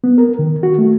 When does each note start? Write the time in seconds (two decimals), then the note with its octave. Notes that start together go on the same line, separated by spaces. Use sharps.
0.04 B3
0.18 A#4
0.39 D#3
0.63 F#4
0.78 A3